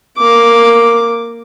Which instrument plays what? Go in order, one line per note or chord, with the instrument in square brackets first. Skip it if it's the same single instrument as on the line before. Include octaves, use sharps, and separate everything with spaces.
[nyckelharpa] A#3 D6